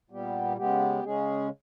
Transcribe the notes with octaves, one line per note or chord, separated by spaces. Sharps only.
A#2 G3 B3 G4
C#3 G#3 B3 G4
C#3 G#3 C#4 G#4